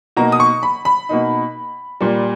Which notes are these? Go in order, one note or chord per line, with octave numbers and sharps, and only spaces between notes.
B2 A#3 D#4 A#5
D#6
C#6
B5
B5
B2 A#3 D#4
A#2 G3 A#3